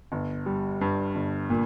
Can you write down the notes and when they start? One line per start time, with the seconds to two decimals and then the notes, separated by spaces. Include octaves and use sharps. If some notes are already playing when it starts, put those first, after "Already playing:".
0.12 G1
0.46 G3
0.81 G2
1.15 G1
1.50 A#2